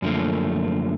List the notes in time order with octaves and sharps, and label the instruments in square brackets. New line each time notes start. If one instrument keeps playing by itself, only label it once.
[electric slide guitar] F#2 D3 F3 A3 A#3